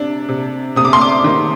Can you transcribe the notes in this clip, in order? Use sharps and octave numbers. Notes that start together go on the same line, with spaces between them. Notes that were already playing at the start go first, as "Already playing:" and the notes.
Already playing: C3 D4
C3
C3 D#6
D6
C6
D6
D#3